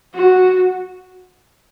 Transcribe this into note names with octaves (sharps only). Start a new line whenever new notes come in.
F#4